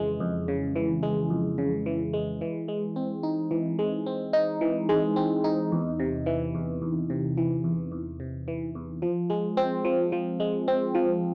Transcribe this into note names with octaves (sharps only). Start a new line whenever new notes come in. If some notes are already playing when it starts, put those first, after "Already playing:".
Already playing: F2 C#3 E3 G#3
F2
C#3
E3
G#3
F2
C#3
E3
G#3
E3
G#3
C4
D#4
E3
G#3
C4
D#4
E3
G#3
C4
D#4
E2
C3
E3
E2
E2
C3
E3
E2
E2
C3
E3
E2
F3
G#3
C4
F3
F3
G#3
C4
F3